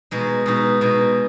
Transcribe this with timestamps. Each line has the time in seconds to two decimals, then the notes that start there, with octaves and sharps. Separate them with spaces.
0.11 B2 G#3 D#4
0.46 B2 G#3 D#4
0.81 B2 G#3 D#4